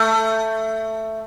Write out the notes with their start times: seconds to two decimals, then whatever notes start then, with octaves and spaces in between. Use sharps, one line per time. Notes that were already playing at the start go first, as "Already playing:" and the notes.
Already playing: A3